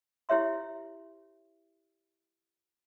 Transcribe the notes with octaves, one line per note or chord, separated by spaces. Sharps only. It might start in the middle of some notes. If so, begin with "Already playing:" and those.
E4 G4 C#5 E5 C6